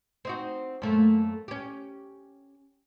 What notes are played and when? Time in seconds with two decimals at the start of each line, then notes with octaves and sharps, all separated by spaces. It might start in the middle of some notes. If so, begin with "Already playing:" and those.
0.25 C4 D#4 F#4
0.82 F#2 A3 A#3
1.48 C#4 G4